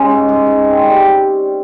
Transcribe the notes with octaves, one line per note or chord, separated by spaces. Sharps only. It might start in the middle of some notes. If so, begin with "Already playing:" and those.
Already playing: C#3 G#3 C#4
G#2
G#2
G#2
C4
G3
G3